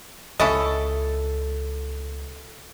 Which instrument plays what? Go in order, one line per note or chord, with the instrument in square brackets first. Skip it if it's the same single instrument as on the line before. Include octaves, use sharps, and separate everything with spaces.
[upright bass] C#2 [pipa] C#4 E4 D#5 [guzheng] A4